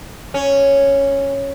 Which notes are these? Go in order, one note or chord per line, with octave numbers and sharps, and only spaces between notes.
C#4